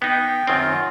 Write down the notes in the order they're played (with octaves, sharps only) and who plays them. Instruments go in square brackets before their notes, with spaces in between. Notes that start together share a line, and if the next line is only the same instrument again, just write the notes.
[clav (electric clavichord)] B3 D#4 [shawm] G5
[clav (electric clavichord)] F#2 D#3 C4 [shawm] F4